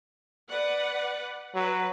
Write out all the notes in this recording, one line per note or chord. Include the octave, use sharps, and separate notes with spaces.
B4 D5 F#5
F#3 B4